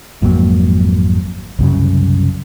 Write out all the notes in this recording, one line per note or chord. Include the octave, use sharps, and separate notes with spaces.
G#1 F2 F#3 A#3
C2 F#2 C#3